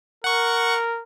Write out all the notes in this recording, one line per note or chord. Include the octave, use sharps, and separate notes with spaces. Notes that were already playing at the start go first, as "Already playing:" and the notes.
A#4 F#5 C#6